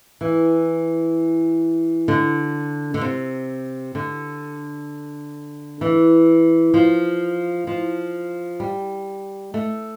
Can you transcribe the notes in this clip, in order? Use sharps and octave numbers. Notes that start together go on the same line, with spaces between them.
E3
D3
D3
C3
D3
E3
F3
F3
G3
A3